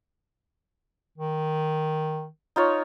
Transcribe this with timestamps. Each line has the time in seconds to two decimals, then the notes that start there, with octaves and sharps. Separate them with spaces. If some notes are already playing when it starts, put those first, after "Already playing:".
1.18 D#3
2.56 D#4 F4 C#5